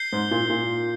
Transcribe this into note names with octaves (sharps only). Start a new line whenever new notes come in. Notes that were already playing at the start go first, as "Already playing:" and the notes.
Already playing: G6 C7 G7
G#2
A#2
A#2